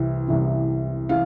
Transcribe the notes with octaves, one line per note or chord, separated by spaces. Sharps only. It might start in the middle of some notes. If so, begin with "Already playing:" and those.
Already playing: C2 C3 E3
C2 C3 E3
E3 F5